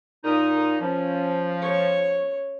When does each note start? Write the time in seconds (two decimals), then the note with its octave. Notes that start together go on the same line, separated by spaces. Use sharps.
0.24 A#2 D#4 A#4 D#6
0.80 F3 C#4
1.62 C#5 C#6